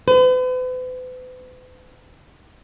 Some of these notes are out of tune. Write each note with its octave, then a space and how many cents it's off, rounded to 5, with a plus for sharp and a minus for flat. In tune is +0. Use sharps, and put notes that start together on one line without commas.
B4 +45